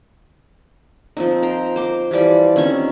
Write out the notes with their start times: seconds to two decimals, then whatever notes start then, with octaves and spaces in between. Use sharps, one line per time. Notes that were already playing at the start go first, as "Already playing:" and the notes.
1.17 F3 C4 D#4
1.42 C5 G5 A#5
1.76 C5 D6
2.11 E3 F3 G3 D5
2.56 D#3 C4 C#4 C#6